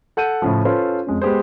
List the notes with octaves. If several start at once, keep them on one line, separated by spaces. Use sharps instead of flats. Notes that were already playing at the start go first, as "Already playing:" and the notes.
A4 F#5 G6 D#7
A2 C#3 F3
C#4 F4 A4 B4 C5
F2 G#3 C#4
G#3 B3 G4 G#4 C5